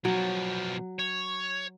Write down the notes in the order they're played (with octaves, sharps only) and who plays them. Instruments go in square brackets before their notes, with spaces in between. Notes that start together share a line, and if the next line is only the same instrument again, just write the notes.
[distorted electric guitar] B2 F3 [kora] F#3
[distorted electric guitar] C#5